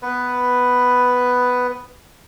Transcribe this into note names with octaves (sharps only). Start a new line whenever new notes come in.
B3 B4